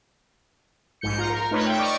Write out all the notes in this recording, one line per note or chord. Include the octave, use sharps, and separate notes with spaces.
A#1 G#2 G6 C#7
F4 A#5
A#4
A3 D#4 F4 B4 C#5
E5 G5
D5 D#5 C#6 D6 F6